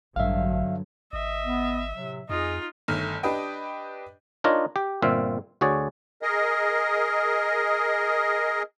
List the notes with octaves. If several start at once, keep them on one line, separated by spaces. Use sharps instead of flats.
A1 G2 D3 F#3 E5 F5
G#1 D#5 E5
B3
A2 C3 F#3
F2 D#4 F4 G#4 D#5
G1 D#3 A3 F6
D4 G4 B4 D#5 G5
D4 D#4 F4 A#4 C#5 D#5
G4
G1 A#2 C4 E5 F5
D2 F#4 G#4 C#5 D5
G#4 A#4 D#5